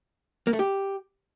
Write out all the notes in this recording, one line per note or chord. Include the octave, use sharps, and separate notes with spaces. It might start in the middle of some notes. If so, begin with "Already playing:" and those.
A#3
A3
G4